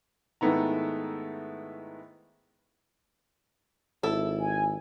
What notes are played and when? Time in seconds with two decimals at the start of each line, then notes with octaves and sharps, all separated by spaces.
0.41 G#2 D#3 A3 B3 E4 A#5
4.03 G#1 E4 A4
4.39 G#5